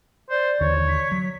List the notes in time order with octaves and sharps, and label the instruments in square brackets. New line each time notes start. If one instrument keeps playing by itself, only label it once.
[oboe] C5 [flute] D5
[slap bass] D#2 D3 E3 [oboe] C#5
[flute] B6
[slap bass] F#3